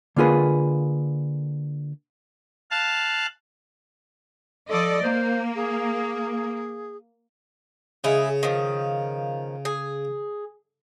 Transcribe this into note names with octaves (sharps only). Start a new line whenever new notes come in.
D3 A#3 F4 G#4 B4
F5 A5 F#6
F3 A4 D5 D#5
A#3 C5
G#4
C#3 G#3 E4 G#4
D#3 F3
G#4